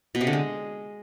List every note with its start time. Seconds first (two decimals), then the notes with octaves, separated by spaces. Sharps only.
0.15 B2
0.21 C3
0.27 D3
0.33 G#3